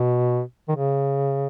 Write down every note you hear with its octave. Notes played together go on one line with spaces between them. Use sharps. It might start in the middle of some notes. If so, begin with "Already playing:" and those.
Already playing: B2
D#3
C#3